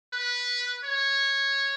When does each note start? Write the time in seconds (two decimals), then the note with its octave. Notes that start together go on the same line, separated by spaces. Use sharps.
0.13 B4
0.84 C#5